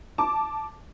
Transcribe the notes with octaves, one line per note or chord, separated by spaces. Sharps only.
A5 D6